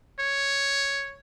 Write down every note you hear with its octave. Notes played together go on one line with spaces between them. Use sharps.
C#5